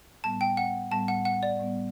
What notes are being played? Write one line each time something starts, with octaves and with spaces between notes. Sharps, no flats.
A2 G3 B3 A5
G5
F#5
A2 G3 B3 A5
F#5
F#5
D5
A2 G3 B3